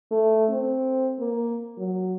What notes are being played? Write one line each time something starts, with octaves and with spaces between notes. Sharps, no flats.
A3
C4
A#3
F#3